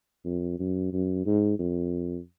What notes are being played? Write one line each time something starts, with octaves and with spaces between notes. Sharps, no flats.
F2
F#2
F#2
G#2
F2